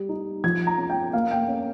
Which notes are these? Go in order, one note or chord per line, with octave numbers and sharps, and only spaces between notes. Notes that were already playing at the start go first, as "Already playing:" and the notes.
Already playing: G3
D#4
F3 G#6
A#5
C#4
G5
A#3 F5
G5
C#4